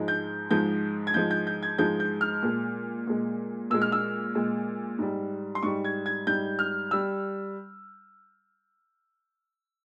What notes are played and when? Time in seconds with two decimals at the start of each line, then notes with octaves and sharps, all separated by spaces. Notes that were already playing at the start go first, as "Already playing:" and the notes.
Already playing: G#2 F3 G#3
0.08 G6
0.50 G#2 F3 G#3 G6
1.07 G#6
1.14 G#2 F3 G#3 G6
1.31 G6
1.47 G6
1.63 G#6
1.78 G#2 F3 G#3 G6
2.00 G6
2.21 F6
2.43 A#2 G#3
3.07 A#2 G#3
3.70 A#2 G#3 E6
3.82 F6
3.92 E6
4.35 A#2 G#3
4.99 G#2 G3
5.55 C6
5.63 G#2 G3 C#6
5.85 G#6
6.06 G#6
6.27 G#2 G3 G6
6.59 F6
6.91 G3 E6